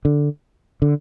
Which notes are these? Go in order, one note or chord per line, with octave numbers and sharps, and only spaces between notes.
D3
D3